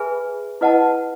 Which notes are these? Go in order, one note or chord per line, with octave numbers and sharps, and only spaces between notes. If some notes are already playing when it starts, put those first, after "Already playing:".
Already playing: G#4 B4 E5 G#5 B5
E4 B4 D#5 F#5 A5